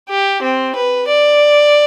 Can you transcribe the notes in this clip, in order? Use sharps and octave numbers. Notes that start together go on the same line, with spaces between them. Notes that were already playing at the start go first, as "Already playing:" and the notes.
G4
C4
B4
D5